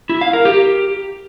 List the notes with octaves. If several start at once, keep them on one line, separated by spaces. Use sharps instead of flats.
E4
F5
A#4
G4